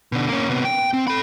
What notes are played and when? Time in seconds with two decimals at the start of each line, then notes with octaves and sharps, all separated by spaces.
0.12 B2 D3
0.29 A#3 C#4
0.49 C3 B3
0.65 G5
0.93 C4
1.08 A4 B5